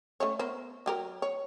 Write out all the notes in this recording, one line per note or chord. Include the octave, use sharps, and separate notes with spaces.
A3 C#4 C#5
B3 A#4 C5
F#3 G4 A#4
C#5